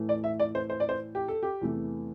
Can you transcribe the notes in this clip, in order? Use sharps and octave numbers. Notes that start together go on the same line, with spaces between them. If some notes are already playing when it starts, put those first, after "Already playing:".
Already playing: A2 E3 A3
D5
E5
D5
C5
C5
D5
C5
G4
A4
G4
E2 C3 E3 A3